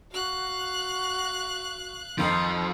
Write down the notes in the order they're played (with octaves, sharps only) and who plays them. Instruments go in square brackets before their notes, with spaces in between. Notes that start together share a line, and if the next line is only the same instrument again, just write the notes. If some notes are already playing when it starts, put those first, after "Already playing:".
[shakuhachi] F#4 [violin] F5 F#6
[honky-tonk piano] F2 D#3 [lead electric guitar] F3 [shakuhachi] D#4